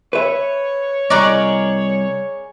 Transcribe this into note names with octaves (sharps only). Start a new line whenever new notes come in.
B4 C#5 E5
C2 G#4 A#4 D5 D#5 C#6 F#6